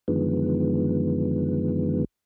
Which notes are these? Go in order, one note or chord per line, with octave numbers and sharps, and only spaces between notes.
F#2 D3 D#3 F3 G#3 B3